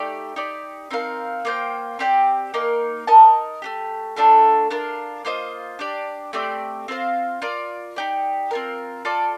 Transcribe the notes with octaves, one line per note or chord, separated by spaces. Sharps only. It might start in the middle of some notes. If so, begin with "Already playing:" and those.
Already playing: A3 D#4 G4 D5
D#4 G4 D5
C4 D#4 A#4 F5
A#3 F4 C5 G5
C4 G4 D5 G5
A#3 D#4 A#4
D#4 A#4 D#5 A5
A3 D4 G4
A3 D4 F4 A4
D4 F4 A#4
A#3 F4 C5 D#5
D4 G4 D5
A3 C4 G4 D5
C4 F4 C5 F5
F4 A#4 D5
D#4 G4 D5
C4 F4 A#4
F4 A4 D5 A5